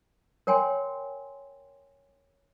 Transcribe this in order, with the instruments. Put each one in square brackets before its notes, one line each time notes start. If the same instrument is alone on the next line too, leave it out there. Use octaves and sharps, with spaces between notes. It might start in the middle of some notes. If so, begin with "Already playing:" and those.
[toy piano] A#4 C#5 G5 G#5 C6